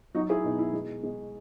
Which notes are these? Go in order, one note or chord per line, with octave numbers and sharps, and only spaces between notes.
F#3 D#4 F#4
E4 G#4
B2 D#4
E4
G#3
G#3